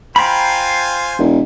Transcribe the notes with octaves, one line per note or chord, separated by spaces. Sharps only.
F4 C5 G5 G#5 A#5 B5
E1